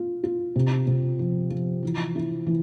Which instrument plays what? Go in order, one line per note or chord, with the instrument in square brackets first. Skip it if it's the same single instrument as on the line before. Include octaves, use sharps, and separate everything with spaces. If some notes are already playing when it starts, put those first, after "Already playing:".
Already playing: [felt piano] F4
F4
C3
C3
F3
F3
E3
E4
E3